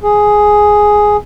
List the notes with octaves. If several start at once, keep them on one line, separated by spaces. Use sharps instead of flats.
G#4